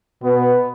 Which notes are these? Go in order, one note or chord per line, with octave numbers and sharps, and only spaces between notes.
B2 B3